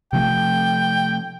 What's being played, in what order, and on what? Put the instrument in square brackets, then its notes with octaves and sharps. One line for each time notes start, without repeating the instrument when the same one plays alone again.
[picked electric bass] C3 F3 A3 [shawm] G5